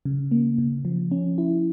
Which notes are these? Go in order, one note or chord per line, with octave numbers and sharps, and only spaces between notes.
C#3
A#3
C#3
F3
C#4
E4